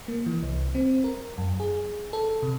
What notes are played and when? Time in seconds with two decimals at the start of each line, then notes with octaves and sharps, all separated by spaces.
0.08 A#3
0.26 E3
0.43 C2
0.75 C4
1.04 A#4
1.38 F#2
1.60 G#4
2.13 A4
2.42 C3